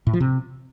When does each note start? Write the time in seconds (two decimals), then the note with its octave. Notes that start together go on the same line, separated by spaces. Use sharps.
0.07 A2
0.13 F3
0.20 C3